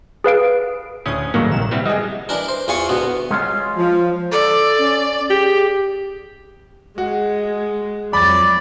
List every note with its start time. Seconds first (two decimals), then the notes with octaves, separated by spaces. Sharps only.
0.24 G#4 B4 F5 D7
1.06 D2 A2 C#4 D#6
1.34 G#2 D#3 F#3 G3 A3 A#3
1.51 A#1 C3 D#3 E7
1.71 G3 B3 C4 E4 F#5
1.85 G3 G#3 G#4 D#5
2.29 E3 D4 A#4
2.48 C5
2.68 E2 E3 F4 F5 G#5 C#6
2.89 D2 B2 B3
3.31 G#3 C#4 F4
3.77 F3
4.32 A4 D5
4.79 C#4
5.30 G4 G#4
6.98 G#3 F#4
8.13 F2 F#3 D5 B5 A6